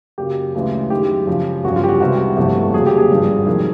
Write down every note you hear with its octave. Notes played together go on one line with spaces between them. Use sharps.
F#2 C#3 F#3 A#3 G4
D2 C#3 E3 G#3
F#2 D#3 G#3 G4
F2 C#3 F3
G1 F2 C#3 F#4
F4
G4
F#4
C2 C3 E3 G#3 F#4
G1 F2 C3 E3 A3
F1 D#2 C#3 F#3 G#4
G4
G#4
G#1 G2 D3 F3
F2 C3 D#3 F#3 A#3